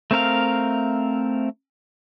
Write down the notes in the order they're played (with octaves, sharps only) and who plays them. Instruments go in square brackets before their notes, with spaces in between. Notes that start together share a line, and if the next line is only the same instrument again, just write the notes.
[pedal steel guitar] A3 C4 A#4 F5